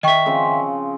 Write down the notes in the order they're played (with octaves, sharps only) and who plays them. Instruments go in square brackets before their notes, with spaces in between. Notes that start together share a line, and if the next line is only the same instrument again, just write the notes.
[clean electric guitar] D#3 E5 [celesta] D#5 G5 C#6
[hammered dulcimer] C#3 F3 C4